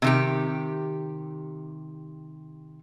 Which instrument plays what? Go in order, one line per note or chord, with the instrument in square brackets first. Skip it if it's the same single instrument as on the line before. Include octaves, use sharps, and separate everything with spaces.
[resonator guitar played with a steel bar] C3 D#3 G4